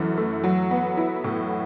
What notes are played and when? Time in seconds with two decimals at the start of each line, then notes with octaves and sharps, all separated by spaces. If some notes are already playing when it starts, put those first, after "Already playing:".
Already playing: F#2 E3 A3 E4
0.17 A3
0.44 F#3
0.71 B3
0.97 E4
1.24 A2